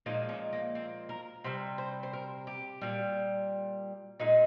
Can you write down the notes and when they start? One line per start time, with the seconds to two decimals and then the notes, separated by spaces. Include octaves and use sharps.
0.06 A#2 F3 G#3 D#4
0.29 C#4
0.53 A#3
0.75 C4
1.09 A#4
1.44 C3 G3 C5
1.78 C5
2.03 C5
2.13 A#4
2.47 G4
2.82 A#2 G3
4.20 A#2 G#3 D#4